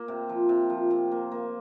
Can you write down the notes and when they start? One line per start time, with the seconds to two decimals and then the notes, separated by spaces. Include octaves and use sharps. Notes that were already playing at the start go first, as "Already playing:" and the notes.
Already playing: A#3
0.08 C3
0.29 F3
0.49 C3
0.70 F3
0.90 C3
1.12 A#3
1.32 A#3